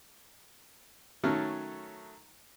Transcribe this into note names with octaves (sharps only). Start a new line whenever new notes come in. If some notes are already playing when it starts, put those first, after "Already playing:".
D#3 F#3 A3 C#4 A4 F6